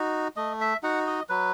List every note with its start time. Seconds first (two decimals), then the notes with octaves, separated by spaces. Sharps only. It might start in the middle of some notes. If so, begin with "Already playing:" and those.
Already playing: D#4 F#4
0.36 A3 D#5
0.61 E5
0.83 D#4 F#4 F#5
1.07 D#5
1.29 F#3 B4